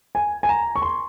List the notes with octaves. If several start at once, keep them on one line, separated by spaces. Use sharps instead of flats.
G#5
G#5
A#5
C#6
C6